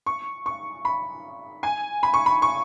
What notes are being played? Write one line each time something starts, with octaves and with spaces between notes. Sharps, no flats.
C#6
C#6
B5
G#5
B5
C#6
B5
C#6